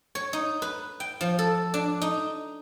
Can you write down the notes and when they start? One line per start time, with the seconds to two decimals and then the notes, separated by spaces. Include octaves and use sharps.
0.15 C#5
0.33 D#4
0.62 B4
1.00 G5
1.21 F3
1.39 A4
1.74 D4
2.02 D#4